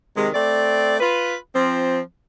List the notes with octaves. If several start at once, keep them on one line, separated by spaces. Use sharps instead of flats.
C3 D#3 G#3
A3 C4 D5
F4 B4
F3 C4